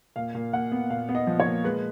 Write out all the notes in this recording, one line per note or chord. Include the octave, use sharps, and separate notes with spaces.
A#2 F5
A#2
A#2 F#5
B3
A#2 F5
B3
D#5
F3
C#5
A#2
G#3 B4